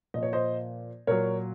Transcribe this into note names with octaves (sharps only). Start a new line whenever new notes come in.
A#2 F3 D#5
C#5
C5 D#5
A#2 F#3 A#4 C#5